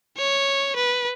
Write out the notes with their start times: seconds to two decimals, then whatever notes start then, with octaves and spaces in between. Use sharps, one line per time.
0.18 C#5
0.76 B4